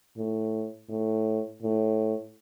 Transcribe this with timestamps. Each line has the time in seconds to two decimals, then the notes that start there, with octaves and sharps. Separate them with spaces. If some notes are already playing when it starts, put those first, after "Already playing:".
0.17 A2
0.89 A2
1.63 A2